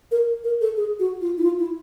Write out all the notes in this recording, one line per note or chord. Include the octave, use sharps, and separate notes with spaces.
A#4
A#4
A4
G#4
F#4
F4
E4
F4
E4